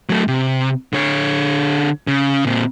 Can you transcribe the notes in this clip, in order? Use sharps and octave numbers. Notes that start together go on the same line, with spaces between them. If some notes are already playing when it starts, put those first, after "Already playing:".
F#3 A3
C3
D3 C#5
C#3
A#2 C4